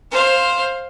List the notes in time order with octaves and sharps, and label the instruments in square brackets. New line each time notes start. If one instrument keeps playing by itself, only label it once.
[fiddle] C5 F5